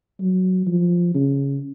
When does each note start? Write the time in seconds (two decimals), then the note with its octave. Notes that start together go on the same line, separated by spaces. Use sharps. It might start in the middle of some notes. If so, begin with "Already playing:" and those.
0.21 F#3
0.67 F3
1.14 C#3